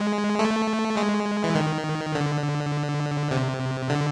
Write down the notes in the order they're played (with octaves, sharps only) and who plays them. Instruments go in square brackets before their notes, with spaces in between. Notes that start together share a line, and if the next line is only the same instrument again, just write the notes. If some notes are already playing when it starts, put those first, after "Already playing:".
Already playing: [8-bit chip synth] G#3
A3
G#3
E3
D#3
D3
C3
D3